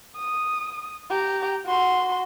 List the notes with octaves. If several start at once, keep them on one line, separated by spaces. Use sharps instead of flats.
D#6
G4 A#5
F#4 C6